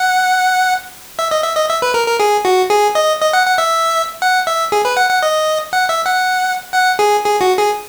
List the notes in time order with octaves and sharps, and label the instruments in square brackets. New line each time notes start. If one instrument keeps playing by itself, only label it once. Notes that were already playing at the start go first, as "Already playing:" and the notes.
Already playing: [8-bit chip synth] F#5
E5
D#5
E5
D#5
E5
B4
A#4
A#4
G#4
F#4
G#4
D#5
D#5
F#5
F#5
E5
F#5
E5
G#4
B4
F#5
F#5
D#5
F#5
E5
F#5
F#5
G#4
G#4
F#4
G#4